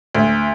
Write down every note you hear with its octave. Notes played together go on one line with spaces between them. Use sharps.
D2